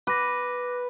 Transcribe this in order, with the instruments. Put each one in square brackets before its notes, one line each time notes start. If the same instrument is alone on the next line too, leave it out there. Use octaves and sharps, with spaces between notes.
[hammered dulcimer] B4 [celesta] D6 A#6